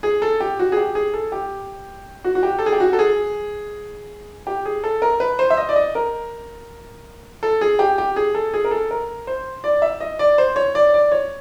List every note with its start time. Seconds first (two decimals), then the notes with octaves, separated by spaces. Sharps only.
0.03 G#4
0.22 A4
0.40 G4
0.59 F#4
0.72 G#4
0.77 G4
0.95 G#4
1.14 A4
1.32 G4
2.24 F#4
2.35 F#4
2.43 G4
2.59 A4
2.66 G#4
2.73 G4
2.80 F#4
2.93 A4
2.99 G#4
4.47 G4
4.65 G#4
4.84 A4
5.02 A#4
5.20 B4
5.39 C5
5.50 E5
5.57 D#5
5.69 D5
5.76 D#5
5.95 A#4
7.43 A4
7.61 G#4
7.79 G4
7.98 G4
8.16 G#4
8.35 A4
8.54 G#4
8.65 A#4
8.71 A4
8.91 A#4
9.27 C5
9.64 D5
9.82 E5
10.00 D#5
10.19 D5
10.38 C5
10.56 C#5
10.75 D5
10.94 D5
11.12 C#5